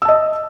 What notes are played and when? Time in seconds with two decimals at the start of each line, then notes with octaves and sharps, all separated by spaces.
0.02 E6
0.05 A5
0.08 D#5